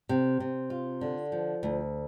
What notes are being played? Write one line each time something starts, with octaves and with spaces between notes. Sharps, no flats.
C3
C3
F4
D3
F3
D2